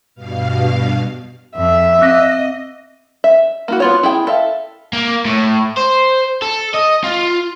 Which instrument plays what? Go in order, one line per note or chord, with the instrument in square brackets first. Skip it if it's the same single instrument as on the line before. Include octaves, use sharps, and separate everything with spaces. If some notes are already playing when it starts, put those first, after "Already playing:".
[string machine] G2 B2 F5
[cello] F2 [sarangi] E5
[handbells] C4 A#6 [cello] D#5
[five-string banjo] E5
A#3 E4 F#4
B3 F4 C#5
E4 G#4 G5
A4 E5 F5
[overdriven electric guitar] A#3
A2
C5
A4
D#5
F4